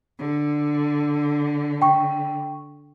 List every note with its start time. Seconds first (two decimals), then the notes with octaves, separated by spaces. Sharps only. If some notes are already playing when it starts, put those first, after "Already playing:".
0.18 D3
1.82 G5 C#6